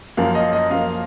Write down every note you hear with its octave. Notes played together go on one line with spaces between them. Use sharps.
F#2 F3 A#3 F5
D#5
D#5
F#2 F3 A#3 F5